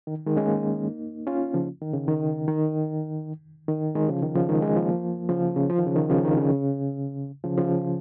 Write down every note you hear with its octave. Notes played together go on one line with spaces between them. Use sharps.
D#3
D#3 G#3
G#3 C#4
A#3 D#4
C#4 F4
C#3 F3
D#3
C#3
D#3
D#3
D#3
D#3 G#3
C#3 F3
D#3
C#3 F3
D#3 G#3
G#3 C#4
F3 A#3
C#3 F3
C#3
F3
D#3
C#3
D#3
C#3 F3
D#3
C#3
C#3 F3
C#3 F3